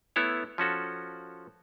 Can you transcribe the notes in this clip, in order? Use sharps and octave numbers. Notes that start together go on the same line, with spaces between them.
A3 B3 E4 C#5
F3 C#4 F#4 A4